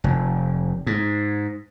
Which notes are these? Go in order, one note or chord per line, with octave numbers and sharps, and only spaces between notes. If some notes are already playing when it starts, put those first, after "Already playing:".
F1
G#2